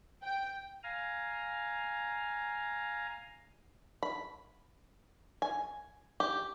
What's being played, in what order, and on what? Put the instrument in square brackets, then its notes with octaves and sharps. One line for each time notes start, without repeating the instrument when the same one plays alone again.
[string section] G5
[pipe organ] F5 G#5 A#5
[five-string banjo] B5
G#5
G4